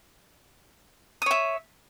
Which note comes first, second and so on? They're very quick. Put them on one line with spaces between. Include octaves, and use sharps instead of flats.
D#6 C#5 E5